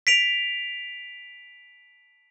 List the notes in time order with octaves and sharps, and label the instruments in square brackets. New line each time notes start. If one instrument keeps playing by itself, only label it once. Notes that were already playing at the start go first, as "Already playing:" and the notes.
[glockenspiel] B6 D7 F7